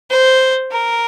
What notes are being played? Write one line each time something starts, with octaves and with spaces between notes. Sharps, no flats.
C5
A#4